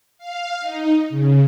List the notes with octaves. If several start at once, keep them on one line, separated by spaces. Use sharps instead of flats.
F5
D#4
C#3